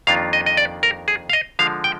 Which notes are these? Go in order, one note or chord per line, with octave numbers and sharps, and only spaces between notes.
F2 D#3 A#3 D4 F4 F5
D#5
D#5
D5
A#4
G#4
F5
D#5
D3 F3 G#3 F5
G5